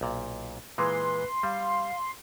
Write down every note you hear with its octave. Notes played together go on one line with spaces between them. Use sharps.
B1 A#2
A#2 E3 G#3 B4 C6
G3 F5